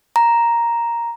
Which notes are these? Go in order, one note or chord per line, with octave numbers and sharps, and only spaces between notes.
A#5